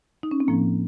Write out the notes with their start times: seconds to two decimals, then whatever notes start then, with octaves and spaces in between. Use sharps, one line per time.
0.23 D#4
0.31 C#4
0.40 C4
0.48 A2 F3 A#3